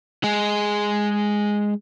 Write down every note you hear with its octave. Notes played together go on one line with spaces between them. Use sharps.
G#3 G#4